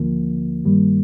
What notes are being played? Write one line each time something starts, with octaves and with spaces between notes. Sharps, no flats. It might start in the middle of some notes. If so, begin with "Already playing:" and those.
Already playing: D2 D3 F3 A#3
G2 D#3 G3 A#3